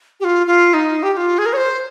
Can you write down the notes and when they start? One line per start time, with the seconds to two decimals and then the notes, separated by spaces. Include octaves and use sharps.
0.20 G4
0.24 F4
0.47 F4
0.74 D#4
1.03 G4
1.13 G4
1.17 F4
1.38 G#4
1.46 A#4
1.53 C#5
1.57 C5